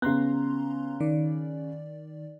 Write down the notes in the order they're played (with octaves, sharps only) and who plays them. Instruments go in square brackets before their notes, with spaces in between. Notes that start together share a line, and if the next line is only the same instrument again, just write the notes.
[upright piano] C#3 F#6 [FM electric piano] B3 A#5 C6
[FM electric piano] D#3 D5